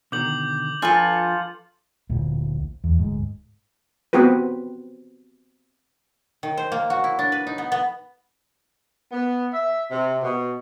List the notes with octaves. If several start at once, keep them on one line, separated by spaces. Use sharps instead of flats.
B2 D3 D#3 D6 G6 F#7
F3 D4 F4 A4 B4 G5 G#5
D1 A#1
E2
D1 G#2
B3 C4 F#4 G4 B4
D#3
C5
A#3
F#4
E4
D4
B4
D#4
B3
B3
B3
E5
C3
B2